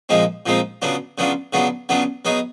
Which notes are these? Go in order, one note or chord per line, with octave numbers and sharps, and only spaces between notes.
A#2 F3 G#3 C4 D#4
A#2 F3 G#3 C4 D#4
C#3 F#3 B3 D4 F4
C#3 F#3 B3 D4 F4
C#3 F#3 B3 D4 F4
C#3 F#3 B3 D4 F4
F#3 B3 D#4 G#4